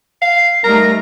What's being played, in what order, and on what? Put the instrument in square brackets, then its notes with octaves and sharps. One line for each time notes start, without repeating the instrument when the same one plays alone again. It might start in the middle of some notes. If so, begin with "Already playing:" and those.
[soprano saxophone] F5 [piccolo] C7
[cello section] G3 A3 D#4 [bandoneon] A#4 [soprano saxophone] A#5